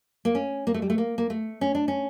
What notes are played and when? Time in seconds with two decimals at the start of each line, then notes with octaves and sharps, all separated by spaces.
0.25 A#3
0.35 C#4
0.67 A#3
0.74 A3
0.82 G3
0.90 A3
0.98 A#3
1.18 A#3
1.30 A3
1.61 C#4
1.75 D4
1.88 C#4